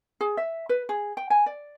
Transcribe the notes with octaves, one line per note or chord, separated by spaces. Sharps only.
G#4
E5
B4
G#4
G5
G#5
D5